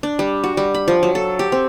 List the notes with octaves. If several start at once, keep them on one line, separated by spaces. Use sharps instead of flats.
D4
G3
F#4
G3
B5
F3
F#3
A4
G4
C4